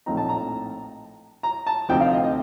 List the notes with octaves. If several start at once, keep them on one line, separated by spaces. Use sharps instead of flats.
A#1 A2 F3 C4 D#4 A#5
A5
A#5
A#5
A5
D2 C3 F3 C4 D#4 G5
F5
D#5
D#5